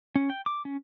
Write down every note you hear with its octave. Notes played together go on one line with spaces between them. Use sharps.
C#4
G5
D6
C#4